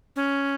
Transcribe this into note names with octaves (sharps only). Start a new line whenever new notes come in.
C#4